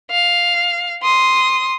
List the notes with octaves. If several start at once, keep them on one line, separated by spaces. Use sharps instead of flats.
F5
C6 D#6